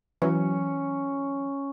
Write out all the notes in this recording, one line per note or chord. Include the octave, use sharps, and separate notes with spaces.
E3 F#3 C#4